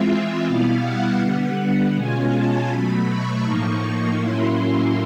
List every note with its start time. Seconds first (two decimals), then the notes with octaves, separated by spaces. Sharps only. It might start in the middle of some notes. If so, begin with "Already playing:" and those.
Already playing: E3 G#3 C4 F4 E5
0.46 B2 G3 B3 E4 F5
0.83 F#5
1.21 D3 G3 B3 F#5
1.57 F#5
1.95 B2 G#3 C#4 F4 G#5
2.32 A5
2.69 B2 F#3 A3 B5
3.07 C#6
3.44 A2 F3 A#3 D#4 C#6
4.18 A2 F#3 A#3 C#4 E4 C6